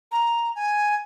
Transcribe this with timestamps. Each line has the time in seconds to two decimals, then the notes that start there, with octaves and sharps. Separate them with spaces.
0.12 A#5
0.56 G#5